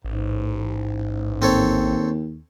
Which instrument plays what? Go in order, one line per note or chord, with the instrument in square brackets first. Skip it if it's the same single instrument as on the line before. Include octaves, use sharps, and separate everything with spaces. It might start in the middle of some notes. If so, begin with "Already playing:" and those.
[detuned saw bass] A1 [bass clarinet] G#2
[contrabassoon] D#2 [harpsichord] C4 A4 C#5